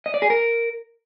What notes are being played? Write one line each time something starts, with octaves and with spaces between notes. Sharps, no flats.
D#5
D5
G#4
A#4